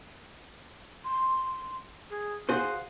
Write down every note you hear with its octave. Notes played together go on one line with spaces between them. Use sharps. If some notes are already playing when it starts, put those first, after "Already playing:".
C6
G#4
F#4 G#4 C5 F5